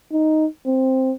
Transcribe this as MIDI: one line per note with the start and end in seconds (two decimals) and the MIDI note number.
0.12 0.46 63
0.66 1.13 60